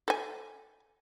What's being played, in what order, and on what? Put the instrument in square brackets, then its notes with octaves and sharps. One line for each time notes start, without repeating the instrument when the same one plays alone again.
[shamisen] A4 G#5